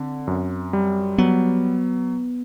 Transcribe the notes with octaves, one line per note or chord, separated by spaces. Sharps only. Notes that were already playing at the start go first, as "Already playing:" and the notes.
Already playing: D3 C4
F#2
G3
F#3 B3